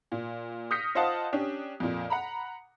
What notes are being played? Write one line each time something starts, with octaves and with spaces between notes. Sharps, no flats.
A#2
D#6 F6 G6 A#6 B6 C#7
F4 C5 D#5 F5 F#5 A5
C#4 D4 G4
F2 A#2
F#5 A#5 B5